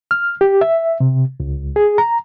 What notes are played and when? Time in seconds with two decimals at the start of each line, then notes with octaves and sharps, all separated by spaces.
0.11 F6
0.41 G4
0.61 E5
1.00 C3
1.40 C#2
1.76 G#4
1.98 A#5